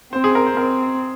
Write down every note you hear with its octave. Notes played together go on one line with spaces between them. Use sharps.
C4 C5
G#4
A#4
C5
C4 A#4